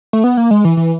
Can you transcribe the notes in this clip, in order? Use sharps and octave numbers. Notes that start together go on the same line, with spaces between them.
A3
B3
A#3
G#3
E3
E3